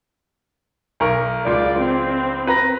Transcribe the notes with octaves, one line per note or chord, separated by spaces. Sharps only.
B1 A#4 C#6
C#2 F4 D5
C4
B4 A#5 A#6